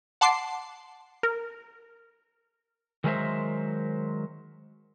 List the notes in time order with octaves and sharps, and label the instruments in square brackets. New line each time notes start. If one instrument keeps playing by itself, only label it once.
[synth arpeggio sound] F#5 A5 C6 D6 C7
A#4
[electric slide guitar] D#3 F#3 G#3 A#4 C5 E5